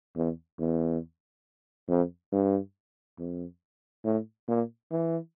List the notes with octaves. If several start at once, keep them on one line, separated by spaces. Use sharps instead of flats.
E2
E2
F2
G2
F2
A2
A#2
E3